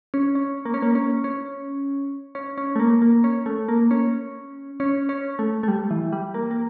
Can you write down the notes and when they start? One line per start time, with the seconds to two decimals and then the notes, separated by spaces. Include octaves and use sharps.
0.14 C#4
0.35 C#4
0.65 A#3
0.74 C#4
0.82 A#3
0.95 C#4
1.24 C#4
2.35 C#4
2.58 C#4
2.76 A3
2.80 A#3
3.02 A#3
3.24 C#4
3.46 A3
3.68 A#3
3.91 C#4
4.80 C#4
5.09 C#4
5.39 A3
5.63 A3
5.68 G3
5.91 E3
6.12 G3
6.34 A#3
6.51 A#3